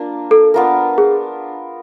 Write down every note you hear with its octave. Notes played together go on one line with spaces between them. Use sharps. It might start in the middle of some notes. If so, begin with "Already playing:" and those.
Already playing: A#3 D4 F4
A4
B3 D4 F4 A#4
G#4